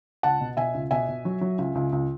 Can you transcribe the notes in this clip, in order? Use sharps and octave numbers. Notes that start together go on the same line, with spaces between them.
C#2 F#5 A5
B2
B2 E5 G#5
C#2
B2 E5 G#5
B2
F#3
F#3
C#2
C#2
C#2